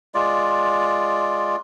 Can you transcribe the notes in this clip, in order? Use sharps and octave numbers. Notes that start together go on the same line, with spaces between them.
G#3 F4 D5